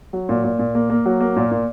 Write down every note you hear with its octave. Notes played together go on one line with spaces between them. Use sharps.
F#3
A#2
A#2
A#2
A#3
A#3
F#3
A#3
A#2
A#2